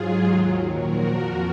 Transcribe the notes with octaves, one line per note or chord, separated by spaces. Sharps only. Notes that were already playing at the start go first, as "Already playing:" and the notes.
Already playing: G#2 F#3 F4 G#4
D#2 D#3 F#3
A#2 F3 F#4 A#4
F2 F3